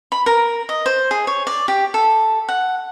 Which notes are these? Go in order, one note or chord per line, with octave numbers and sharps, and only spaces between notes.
B5
A#4
D#5
C5
G#4
C#5
D5
G4
A4
F#5